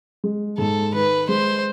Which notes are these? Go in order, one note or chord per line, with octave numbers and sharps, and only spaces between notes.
G#3
G#2 A4
D#3 B4
G#3 C5